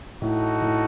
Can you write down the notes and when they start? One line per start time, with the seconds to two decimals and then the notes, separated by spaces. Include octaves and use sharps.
0.22 A2 D#4 F#4 A4
0.62 A2